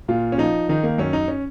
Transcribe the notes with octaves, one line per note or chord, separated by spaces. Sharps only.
A#2 F4
C#4
F3 D#4
D#3 D#4
A#3
F#2 C#4
D#4
C#4